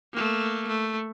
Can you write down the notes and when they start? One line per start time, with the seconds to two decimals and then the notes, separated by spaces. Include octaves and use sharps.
0.14 A3 A#3
0.68 A3